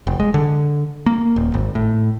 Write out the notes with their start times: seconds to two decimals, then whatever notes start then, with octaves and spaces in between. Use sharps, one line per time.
0.07 F1
0.20 G#3
0.34 D3
1.06 A#3
1.36 D#1
1.54 G#1
1.75 A2